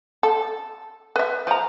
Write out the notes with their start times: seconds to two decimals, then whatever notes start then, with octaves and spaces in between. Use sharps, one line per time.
0.23 A4
1.16 B4 E5
1.47 F3 A#5